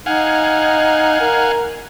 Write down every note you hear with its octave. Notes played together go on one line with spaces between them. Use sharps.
D#4 F5 F#5 G#5
A#4